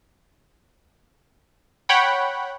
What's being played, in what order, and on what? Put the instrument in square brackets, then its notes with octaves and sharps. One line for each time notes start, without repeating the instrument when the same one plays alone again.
[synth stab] C#5 F#5 G5 B5